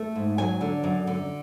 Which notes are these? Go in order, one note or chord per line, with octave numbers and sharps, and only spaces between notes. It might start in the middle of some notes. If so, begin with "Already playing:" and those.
Already playing: A3
G#2
F#3 G#5
D3
F#2
D3